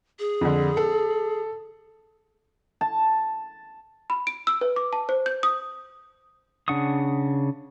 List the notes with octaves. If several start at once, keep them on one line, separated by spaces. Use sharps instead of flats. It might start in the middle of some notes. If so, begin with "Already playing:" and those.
G#4
F2 D3
A4
A5
B5
D7
E6
B4
D6
A5
C5
G6
D#6
C#3 D4 F#5 C#6 D#6